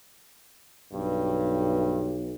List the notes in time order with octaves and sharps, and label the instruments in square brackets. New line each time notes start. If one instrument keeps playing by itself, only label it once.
[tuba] B1 [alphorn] G2